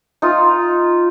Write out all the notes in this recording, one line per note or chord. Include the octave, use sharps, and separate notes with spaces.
D#4 F4